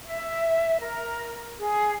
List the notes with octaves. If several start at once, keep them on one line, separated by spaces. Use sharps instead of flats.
E5
A#4
G#4